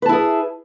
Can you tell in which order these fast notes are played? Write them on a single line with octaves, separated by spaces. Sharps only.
B4 A5 E4 G#4